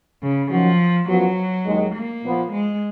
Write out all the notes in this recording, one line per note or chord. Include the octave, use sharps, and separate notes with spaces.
C#3
D#3 F3 F#3 C#4 F#4
F#2 F3 F#3 B3 F#4
D#2 D#3 G#3
A#3
A#2 F3 B3
G#3